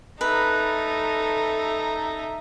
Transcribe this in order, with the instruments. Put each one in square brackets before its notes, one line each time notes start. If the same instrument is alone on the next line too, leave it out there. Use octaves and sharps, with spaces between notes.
[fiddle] D#4 [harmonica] A4 E5 A#5 [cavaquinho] B4